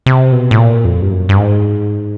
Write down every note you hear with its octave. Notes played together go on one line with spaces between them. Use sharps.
C3
B2
A2
A#2
F2
G2
F#2
G2
G#2